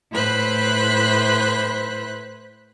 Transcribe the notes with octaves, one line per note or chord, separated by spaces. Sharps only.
A2 E4 B4 C5 B5 F#6